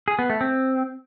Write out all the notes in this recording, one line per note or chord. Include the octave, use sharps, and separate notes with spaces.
G#4
B3
A3
C4